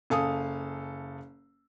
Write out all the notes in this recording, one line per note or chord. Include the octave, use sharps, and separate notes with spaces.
F#1 A4 F5 G#5 D#6